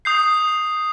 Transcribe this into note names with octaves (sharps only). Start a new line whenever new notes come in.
D#6 G6 C7